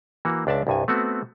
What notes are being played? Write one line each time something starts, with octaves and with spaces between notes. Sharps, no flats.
E3 A#3 F#4
C#2 D4 D5 E5 A5
C2 G2 G#5
A3 B3 C4 F#4